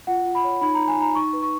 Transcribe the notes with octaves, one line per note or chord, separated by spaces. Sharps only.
F4 F#5
F4
B5
C#5
D#4 B5
D#4 A#5
G#5
D#4 A#5
D#4 C#6
B4
C#6